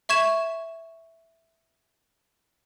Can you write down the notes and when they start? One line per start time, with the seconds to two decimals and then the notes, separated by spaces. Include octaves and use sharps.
0.09 E5 C#6 G#6 E7